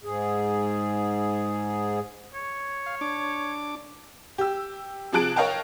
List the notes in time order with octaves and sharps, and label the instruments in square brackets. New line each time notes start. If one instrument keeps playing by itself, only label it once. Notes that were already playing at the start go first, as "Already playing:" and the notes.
[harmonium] G#2 G#4
[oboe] C#5
[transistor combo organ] F5
D4 D6
[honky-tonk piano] G4 E6
C3 F3 G#4 A5 F#6 D7
A#4 C#5 D#5 F5 G5 A5